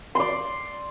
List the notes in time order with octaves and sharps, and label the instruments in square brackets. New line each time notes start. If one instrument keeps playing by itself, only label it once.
[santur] D5 C6